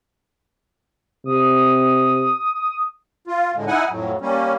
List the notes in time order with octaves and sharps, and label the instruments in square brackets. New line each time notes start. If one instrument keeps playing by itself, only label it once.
[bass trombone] C3 [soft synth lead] D#6
[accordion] F4
A2 D3 G#3
D#4 E4 F#5 G#5
F2 A2 F#3
G3 A#3 C#4